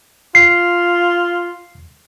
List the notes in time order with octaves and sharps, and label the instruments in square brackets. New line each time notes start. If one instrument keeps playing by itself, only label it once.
[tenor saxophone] F4 [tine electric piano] C7